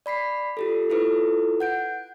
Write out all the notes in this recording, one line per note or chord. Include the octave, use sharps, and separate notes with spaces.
D5 B5 B6 C7
F4 G4 A4
E4 F4 A4 B4
F#5 G6 D7